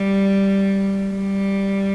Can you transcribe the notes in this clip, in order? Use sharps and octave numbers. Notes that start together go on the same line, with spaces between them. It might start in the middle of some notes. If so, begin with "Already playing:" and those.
Already playing: G3
G3